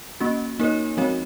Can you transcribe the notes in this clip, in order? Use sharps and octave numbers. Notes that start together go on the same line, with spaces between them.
A#3 C#4 F#4
A#3 D#4 A#4 C#5
F3 G#3 C4 F#4 C#5